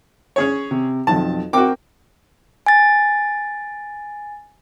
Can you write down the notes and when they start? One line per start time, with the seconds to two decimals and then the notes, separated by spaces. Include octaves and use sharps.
0.36 C#4 G#4 C#5
0.71 C3
1.07 B1 F2 A5
1.53 C4 F#4 A#4 G5 D6
2.66 G#5 A6